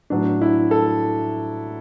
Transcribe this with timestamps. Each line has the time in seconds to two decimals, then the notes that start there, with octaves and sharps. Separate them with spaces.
0.10 A2 F#3 B3 D4
0.41 E4
0.71 A4